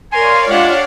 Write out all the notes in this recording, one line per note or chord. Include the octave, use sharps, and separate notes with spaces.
A#4 C#5 D5 F5 G#5 C6
G#3 D4 F4 G4 F#5